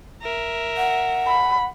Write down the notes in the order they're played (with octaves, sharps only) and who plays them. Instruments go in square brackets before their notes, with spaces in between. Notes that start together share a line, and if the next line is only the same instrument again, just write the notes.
[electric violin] A#4 E5
[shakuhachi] F#5
[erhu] B5